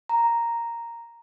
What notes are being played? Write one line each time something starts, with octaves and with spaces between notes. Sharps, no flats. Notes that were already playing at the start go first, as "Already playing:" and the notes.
A#5